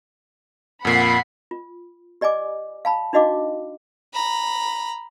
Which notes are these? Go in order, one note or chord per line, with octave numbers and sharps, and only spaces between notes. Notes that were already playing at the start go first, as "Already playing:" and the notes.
F2 A#2 F#5 B5 C7
F4
G4 D5 D#5 G#5 D6
F5 A5 B5
D4 D#4 F#4 D#5 F5 D6
A#5 B5